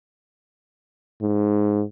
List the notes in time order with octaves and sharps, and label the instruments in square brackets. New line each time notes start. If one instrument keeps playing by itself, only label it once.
[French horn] G#2